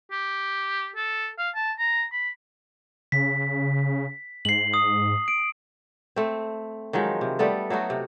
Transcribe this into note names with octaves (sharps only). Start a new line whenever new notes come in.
G4
A4
F5
A5
A#5
B5
C#3 B6
G#2 C7 F#7
D#6
D7
A3 C4
D#3 F3 F#3 G#3
C3
G3 A3 B3 A4
F#3 A3 D#4 F#4
C3